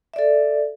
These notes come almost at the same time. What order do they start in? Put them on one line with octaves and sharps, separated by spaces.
E5 D5 A4